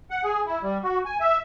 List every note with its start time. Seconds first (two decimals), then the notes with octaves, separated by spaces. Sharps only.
0.11 F#5
0.24 G#4
0.46 E4
0.63 G3
0.83 F#4
1.05 G#5
1.21 E5